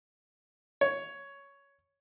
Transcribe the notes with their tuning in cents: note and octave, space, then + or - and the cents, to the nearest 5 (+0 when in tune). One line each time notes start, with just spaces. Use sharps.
C#5 +5